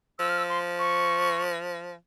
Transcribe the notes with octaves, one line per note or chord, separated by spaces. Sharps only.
F3 E6
F6
E6
C6
C#6